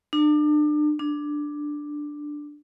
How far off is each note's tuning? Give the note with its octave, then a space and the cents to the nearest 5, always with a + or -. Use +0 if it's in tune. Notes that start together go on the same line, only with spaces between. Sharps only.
D4 +35
D4 +5